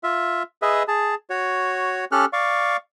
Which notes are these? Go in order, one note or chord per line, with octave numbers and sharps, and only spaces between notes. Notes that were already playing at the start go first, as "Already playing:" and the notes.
F4 E5
G#4 B4 D#5 E5
G#4 A5
F#4 C#5
C#4 G4 A4 F6 F#6
D5 F5 C#6